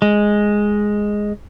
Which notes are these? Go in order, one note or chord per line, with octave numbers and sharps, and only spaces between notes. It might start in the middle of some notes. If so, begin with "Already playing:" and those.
G#3